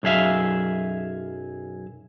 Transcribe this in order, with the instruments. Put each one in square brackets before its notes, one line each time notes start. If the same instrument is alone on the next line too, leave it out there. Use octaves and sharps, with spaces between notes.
[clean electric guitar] B1 F#2 G#4 E5 F5